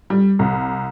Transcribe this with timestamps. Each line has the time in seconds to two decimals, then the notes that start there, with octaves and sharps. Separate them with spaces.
0.10 G3
0.39 C2